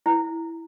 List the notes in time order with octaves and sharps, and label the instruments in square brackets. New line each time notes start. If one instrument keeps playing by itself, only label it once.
[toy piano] E4